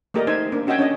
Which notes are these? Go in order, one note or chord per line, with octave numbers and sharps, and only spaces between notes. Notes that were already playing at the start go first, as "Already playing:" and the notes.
A3 A#3 G4 A#4 D5 D#5
D#4 C5 E5 G#5
A#3 D4
C#4 F#4 D#5 E5 G5 G#5
C#4 D4 C#5 D#5